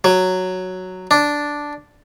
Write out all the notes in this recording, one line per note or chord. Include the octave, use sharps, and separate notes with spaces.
F#3
D4